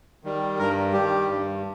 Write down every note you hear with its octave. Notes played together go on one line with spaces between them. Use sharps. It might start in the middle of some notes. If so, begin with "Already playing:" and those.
D#3 G3
G2 A#4
D#3 G3 G4
G2